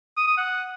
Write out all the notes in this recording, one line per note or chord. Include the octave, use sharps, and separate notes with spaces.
D#6
D#6
F#5